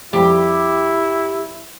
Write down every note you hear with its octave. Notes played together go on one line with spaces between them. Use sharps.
F2 G3 E4 G4